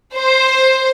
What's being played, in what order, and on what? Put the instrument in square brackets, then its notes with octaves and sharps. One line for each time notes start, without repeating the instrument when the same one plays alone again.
[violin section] C5